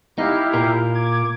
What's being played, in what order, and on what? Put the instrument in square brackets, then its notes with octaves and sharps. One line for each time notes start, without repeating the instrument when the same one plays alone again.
[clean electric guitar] D#4 [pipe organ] E4 G4 F5
[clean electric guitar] A#2 F4 A#4
[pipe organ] D6 G#6